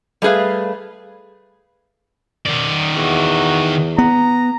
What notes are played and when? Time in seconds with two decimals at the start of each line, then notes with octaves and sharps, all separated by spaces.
0.22 G3 A3 G#4 B4 F5
2.47 D#3 D5
2.96 E2 F#4
3.98 B3 A#5